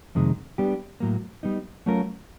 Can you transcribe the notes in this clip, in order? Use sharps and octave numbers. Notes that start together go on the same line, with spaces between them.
F2 C3 D#3 G#3
G3 B3 D4 G4
A2 F#3 A#3
G3 B3 D#4
F#3 A3 C#4 F4 A#4